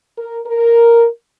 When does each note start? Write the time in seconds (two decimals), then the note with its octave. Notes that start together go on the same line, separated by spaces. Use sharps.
0.18 A#4
0.47 A#4